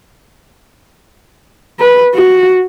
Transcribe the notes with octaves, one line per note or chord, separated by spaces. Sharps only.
B4
F#4